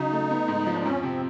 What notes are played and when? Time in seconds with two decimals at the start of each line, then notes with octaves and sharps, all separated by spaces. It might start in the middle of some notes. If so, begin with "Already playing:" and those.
Already playing: C#3 F#3 D#4
0.12 A3
0.31 B3
0.48 G#2
0.67 F3
0.74 D4
0.85 F2 C#4
1.03 C3 C4